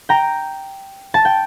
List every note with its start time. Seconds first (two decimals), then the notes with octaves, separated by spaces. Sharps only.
0.09 G5 A#5
1.14 A5
1.25 G5